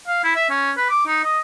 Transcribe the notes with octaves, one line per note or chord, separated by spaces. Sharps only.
F5
E4
E5
C#4
B4
D6
D#4
D#5